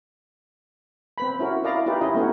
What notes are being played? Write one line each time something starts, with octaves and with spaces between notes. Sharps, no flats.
C4 B4 B5
C#4 E4 F#4 A#4
E4 A#4 D5 D#5 F5 A#5
D#4 F4 G4 B4
C#4 E4 D#5
A3 B3 C#4 D#4 F#4